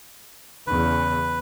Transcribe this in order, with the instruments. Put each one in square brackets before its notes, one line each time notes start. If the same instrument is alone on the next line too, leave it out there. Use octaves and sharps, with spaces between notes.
[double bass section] E2 C#3 [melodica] B4